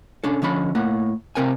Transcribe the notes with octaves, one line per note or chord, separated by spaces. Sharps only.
C#4 D4 A4
D3 F3 C#4 B5
A2 A#3 F#5
C3 G#3 C4 A#4 G5 G#5